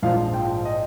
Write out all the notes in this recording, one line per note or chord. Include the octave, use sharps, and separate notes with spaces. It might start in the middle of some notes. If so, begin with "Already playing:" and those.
A#1 G#2 F3 F5
G5
D#5